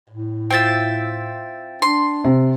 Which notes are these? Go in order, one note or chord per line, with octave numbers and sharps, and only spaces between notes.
A2
C4 F4 E5 G5 A6
D4 C6
C3